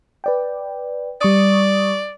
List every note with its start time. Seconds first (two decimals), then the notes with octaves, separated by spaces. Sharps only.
0.24 B4 D5 G5
1.21 G3 D5 C#6 D#6